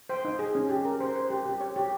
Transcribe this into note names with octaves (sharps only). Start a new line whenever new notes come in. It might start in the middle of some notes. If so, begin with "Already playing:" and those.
C5 G5
D#4
G#4
C#4
G4
A#4
C5
C5
G4
G4
C#5
G4